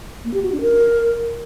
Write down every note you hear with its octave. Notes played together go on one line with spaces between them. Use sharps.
A#3
G4
F#4
D4
A#4